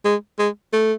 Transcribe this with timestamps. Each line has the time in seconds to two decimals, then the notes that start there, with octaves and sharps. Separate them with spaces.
0.05 G#3
0.39 G#3
0.73 A3